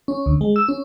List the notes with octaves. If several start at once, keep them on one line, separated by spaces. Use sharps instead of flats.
C#4
D2
G#3
E6
C#4